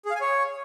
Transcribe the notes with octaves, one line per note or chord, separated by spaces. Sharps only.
G#4
F5
G#5
C#5